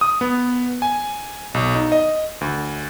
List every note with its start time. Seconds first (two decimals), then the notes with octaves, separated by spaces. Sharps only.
0.01 D#6
0.21 B3
0.82 G#5
1.54 B1
1.75 D#4
1.92 D#5
2.41 D2